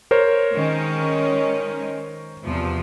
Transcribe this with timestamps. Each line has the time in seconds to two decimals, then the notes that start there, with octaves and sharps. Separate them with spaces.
0.11 A#4 C5 C#5
0.53 D#3 G#3 C#4
2.44 E2 C3 F3